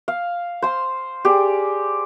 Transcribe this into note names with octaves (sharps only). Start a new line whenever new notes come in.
F5
C5 C6
G4 G#4 D5